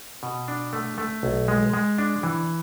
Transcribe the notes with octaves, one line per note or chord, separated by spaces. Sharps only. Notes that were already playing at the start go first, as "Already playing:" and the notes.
B2
D4
A3
A3
B1
G#3
G#3
D4
E3